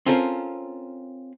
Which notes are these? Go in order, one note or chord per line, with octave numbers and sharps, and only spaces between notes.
C4 C#4 F4 A4 A#4